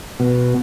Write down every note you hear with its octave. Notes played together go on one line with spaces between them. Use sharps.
B2